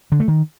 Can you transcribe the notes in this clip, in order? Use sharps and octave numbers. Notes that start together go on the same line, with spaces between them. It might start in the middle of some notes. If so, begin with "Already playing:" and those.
D3
A3
D#3